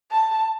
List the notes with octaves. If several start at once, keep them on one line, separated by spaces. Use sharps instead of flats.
A5